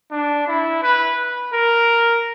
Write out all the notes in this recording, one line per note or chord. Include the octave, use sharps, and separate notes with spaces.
D4
E4
B4
A#4